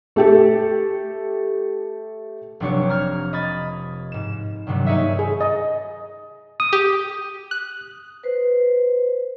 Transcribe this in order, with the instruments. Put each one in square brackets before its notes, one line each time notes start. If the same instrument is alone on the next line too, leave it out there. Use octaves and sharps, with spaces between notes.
[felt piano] A3 G4 A4
[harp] F1 C3 F#3 D4 G4 C#5
A#5 F6 G#6
D#5 B5 D#6 G#6 A6
G#2 E7
G2 C3 D#3 F#3 G3
A#3 D#4 G#4 C#5 D#5 E5
[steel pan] G#4
D#5
[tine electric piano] D#6
[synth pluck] G4
F#6
[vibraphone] B4 C5